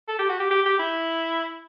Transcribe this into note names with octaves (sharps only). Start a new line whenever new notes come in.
A4
G4
F#4
G4
G4
G4
E4